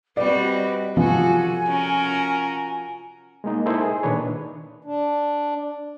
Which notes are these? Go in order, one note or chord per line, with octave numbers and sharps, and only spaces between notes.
G3 C4 F#4 B4 D5 D#5
C3 F3 F#4 A4 G#5
C#4 F#4 A#4
G#3 A#3 D#4
D#4 E4 A4 A#4 C5 D#5
G#4
A#2 D#3 D4 B4 C#5
D4